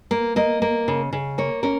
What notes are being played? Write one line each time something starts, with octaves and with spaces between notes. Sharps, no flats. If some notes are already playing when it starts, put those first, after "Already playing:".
A#3
A#3 D#5
A#3
C#3
C#3
A#3 C#5
C#4 A#4